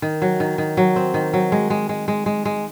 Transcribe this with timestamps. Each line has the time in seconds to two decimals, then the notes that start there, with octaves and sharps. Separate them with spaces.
0.02 D#3
0.22 F#3
0.40 D#3
0.58 D#3
0.77 F#3
0.96 C4
1.14 D#3
1.33 F#3
1.52 G#3
1.70 G#3
1.89 G#3
2.08 G#3
2.26 G#3
2.45 G#3